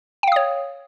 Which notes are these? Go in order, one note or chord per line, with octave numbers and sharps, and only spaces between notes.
C#5 F5 G5 D#6